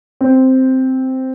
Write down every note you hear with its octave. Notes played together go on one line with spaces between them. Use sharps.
C4